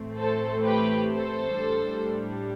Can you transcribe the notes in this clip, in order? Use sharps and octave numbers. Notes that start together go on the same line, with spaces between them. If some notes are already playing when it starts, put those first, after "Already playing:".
Already playing: A2 E3 A3 C4
A4 C5
G4 B4
A4 C5
A2 G3 D4